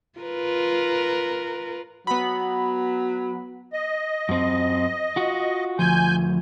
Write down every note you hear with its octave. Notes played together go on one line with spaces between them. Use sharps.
F4 A#4 B4
F#3 B3 B5
D#5
F#2 C4
F4 F#4
D2 F3 G#5 G6